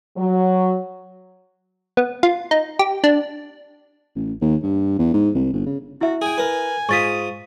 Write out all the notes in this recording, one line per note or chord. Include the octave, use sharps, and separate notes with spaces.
F#3
B3
F4
D#4
G4
D4
A1
D#2
G2
E2
G#2
C2
G1
C#3
E4 F#4 E5
G#4 G5 G#5
A#4 B4
G#2 F4 C#6 D#6 A6 B6